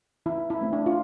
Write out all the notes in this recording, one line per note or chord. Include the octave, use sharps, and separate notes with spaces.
E3 E4
E4
A3 C4
D4
F4